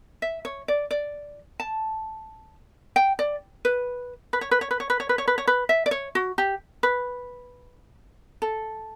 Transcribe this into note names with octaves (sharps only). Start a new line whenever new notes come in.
E5
C#5
D5
D5
A5
G5
D5
B4
B4
C#5
B4
C#5
B4
C#5
B4
C#5
B4
C#5
B4
C#5
B4
E5
D5
C#5
F#4
G4
B4
A4